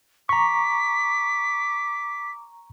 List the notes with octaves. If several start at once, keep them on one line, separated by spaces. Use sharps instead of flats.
A#5 C#6 D6 B6